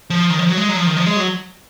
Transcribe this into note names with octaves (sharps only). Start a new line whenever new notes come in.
F3
D#3
F3
F#3
G#3
F#3
F3
D#3
F3
G#3
F#3